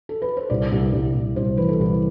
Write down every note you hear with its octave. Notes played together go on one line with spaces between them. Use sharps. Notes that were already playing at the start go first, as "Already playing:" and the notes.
A4
B4
C5
C2 D5
C2
C2
C2
C2 C5
E3 B4
A4
C2 B4